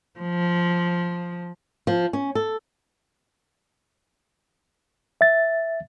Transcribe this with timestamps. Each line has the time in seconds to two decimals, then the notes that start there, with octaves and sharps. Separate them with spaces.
0.20 F3
1.87 F3
2.13 C#4
2.35 A4
5.21 E5 A6